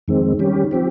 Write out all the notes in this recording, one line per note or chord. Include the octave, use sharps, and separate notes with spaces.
F2 D#3 G#3 C4
D#3 G3 C#4 G4
F3 C4 G4